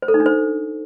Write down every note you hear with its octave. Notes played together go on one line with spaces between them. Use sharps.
C5
A4
D#4
D4
C5